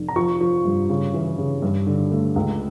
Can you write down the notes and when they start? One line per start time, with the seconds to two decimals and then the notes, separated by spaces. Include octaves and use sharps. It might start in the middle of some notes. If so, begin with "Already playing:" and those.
Already playing: F1
0.08 A#5
0.16 F3 C#6
0.41 F3
0.65 G2
0.89 C#3
1.14 E3
1.38 C#3
1.62 G2
1.87 D3
2.11 A3
2.36 C#2